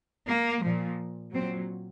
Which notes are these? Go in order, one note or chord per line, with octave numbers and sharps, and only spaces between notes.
A#3
A#2 F3
A#2 F#3 C4